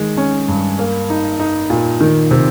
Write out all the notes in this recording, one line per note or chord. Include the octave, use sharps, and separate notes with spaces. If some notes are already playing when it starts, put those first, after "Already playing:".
Already playing: D#3 G#3
C#4
G2
A#3
D#4
D#4
A#2
D#3
C3